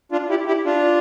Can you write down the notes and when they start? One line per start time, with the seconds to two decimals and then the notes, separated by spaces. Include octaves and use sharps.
0.12 D4 F4
0.30 E4 G4
0.47 E4 G4
0.65 D4 F4